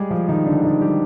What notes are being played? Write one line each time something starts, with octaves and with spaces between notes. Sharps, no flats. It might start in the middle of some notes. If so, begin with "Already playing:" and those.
Already playing: G3 G#3 G4 G#4
F3 F4
D#3 D#4
D3 D4
D#3 D#4
G3 G4